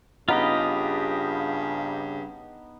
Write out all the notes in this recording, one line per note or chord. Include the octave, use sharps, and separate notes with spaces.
G2 C#3 B3 D#4 F4 G4 D#5